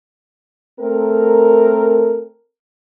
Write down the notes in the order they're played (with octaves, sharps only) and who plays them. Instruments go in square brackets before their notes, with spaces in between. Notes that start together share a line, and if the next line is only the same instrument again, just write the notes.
[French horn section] A3 C4 A4 A#4